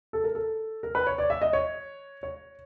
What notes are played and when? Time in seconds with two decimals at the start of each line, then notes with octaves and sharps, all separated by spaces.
0.13 A4
0.24 A#4
0.35 A4
0.83 A#4
0.95 B4
1.07 C#5
1.18 D5
1.30 E5
1.42 D#5
1.53 C#5
2.23 C#5